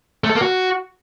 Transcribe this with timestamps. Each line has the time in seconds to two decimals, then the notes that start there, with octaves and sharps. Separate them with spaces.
0.24 A3
0.30 A4
0.35 A#3
0.41 F#4